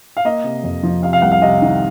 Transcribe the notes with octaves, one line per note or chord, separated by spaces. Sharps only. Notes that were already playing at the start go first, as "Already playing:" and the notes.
F5
A#3 D#5
C3
F2
F3
C3 F5
F5
C2 F#5
F5
C3 D#5
D#3